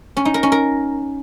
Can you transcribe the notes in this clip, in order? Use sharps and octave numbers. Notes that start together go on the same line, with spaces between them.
C#4
D#4
A#4
C#4
A#4